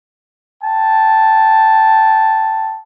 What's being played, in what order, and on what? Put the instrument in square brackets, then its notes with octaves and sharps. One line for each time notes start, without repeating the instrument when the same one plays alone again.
[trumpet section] G5 A5